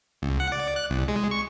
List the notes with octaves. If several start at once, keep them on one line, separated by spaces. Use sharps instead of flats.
C#2
F#5
D5
F#6
C2
G#3
C#6